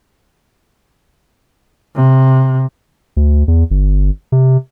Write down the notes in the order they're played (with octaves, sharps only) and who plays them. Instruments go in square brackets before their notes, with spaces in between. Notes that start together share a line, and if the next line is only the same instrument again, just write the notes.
[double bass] C3
[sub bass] D2
E2
G1
C3